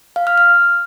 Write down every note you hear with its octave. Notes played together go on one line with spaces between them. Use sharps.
F5
F6
F6